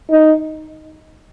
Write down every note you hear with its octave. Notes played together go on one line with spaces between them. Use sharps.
D#4